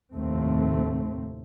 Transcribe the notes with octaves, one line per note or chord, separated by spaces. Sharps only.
F1 D#2 A2 A3 C4